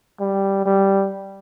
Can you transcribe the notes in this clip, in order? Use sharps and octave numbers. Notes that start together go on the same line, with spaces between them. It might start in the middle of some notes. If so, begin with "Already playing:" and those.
G3
G3